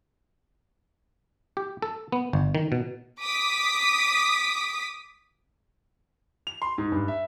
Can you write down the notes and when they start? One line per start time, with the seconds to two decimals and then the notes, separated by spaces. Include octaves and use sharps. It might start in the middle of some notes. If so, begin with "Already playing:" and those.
1.57 G4
1.82 A4
2.12 B3
2.33 G1
2.55 D#3
2.72 B2
3.21 D6 D#6 B6
6.47 F7
6.62 C6
6.78 G#2
6.92 G2
7.08 E5